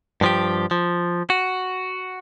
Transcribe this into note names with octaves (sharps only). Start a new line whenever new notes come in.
G2 F3 G4
F3
F#4